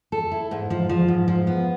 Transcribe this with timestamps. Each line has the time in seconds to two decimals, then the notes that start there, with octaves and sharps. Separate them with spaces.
0.12 A4
0.31 E4
0.51 G#2
0.70 F3
0.89 F3
1.08 G#2
1.28 F3
1.47 B3